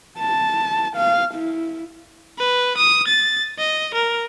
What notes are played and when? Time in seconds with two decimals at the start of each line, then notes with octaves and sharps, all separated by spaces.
0.19 A5
0.97 F5
1.34 E4
2.38 B4
2.77 D#6
3.07 A6
3.58 D#5
3.94 A#4